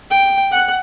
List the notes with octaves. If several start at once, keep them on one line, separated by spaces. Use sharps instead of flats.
G5
F#5